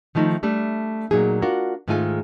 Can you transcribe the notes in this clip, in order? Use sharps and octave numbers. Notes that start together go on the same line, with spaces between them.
D#3 F3 A3 D#4
G3 A3 D4
A#2 F#3 A#3 D#4 G#4
D4 F4 F#4 A#4
G#2 D#3 G#3 A3 F4 G#5